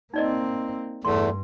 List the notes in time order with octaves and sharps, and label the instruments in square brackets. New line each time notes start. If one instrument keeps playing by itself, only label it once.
[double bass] A#3 C4 [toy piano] D#4 D5 D#5
[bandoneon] E2 [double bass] G2 [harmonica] A3 [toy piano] C6